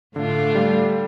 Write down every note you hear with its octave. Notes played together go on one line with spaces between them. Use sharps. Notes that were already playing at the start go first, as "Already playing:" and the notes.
A2 D3 A3 D4 F4
G3